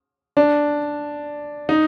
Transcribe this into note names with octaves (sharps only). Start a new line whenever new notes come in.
D4
D#4